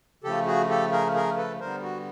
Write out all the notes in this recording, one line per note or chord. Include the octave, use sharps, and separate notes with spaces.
C#3 F3 A3 G4 A4
F#4 G#4
G4 A4
G#4 A#4
G#4 A#4
A4 B4
D3 G3 B3 A#4 C5
F#4